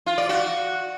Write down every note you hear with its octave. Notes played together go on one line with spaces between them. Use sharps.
F4
D5
F#4